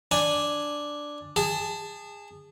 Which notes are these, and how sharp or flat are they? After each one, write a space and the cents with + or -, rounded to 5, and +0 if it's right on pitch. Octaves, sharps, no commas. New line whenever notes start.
D4 +0 G#5 -5
G#4 -25 A5 +0